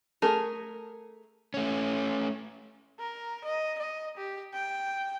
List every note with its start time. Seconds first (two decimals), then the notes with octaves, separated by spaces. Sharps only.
0.22 A3 G#4 A#4
1.54 A3 C#4
2.99 A#4
3.45 D#5
3.79 D#5
4.17 G4
4.54 G5